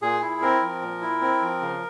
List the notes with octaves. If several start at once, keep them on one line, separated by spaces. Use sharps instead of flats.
A#2 G#4
E4
C4 A#4
F3
A#2
E4
C4
F3
C#3